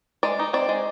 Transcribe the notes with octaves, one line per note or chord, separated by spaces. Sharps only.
G#3 D5
D#4
C4 D5
G#3